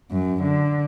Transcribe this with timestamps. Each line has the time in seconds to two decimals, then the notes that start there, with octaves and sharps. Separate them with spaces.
0.11 F#2
0.43 D3